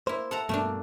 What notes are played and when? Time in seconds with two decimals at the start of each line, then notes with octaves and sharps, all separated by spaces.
0.07 A#3 E4 C5
0.31 A4 F#5 A#5
0.49 G2 B2 A3 A#3 D4